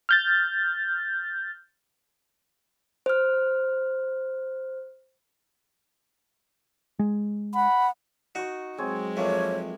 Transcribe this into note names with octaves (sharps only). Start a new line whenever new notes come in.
F6 G6 A6
C5 F6
G#3
F#5 B5
D#4 F#4 C#6
F#3 G#3 C4 G#4 C#5
F2 A3 A#3 C#5